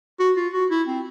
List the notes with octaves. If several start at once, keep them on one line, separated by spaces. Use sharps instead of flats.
F#4
F4
F#4
E4
C4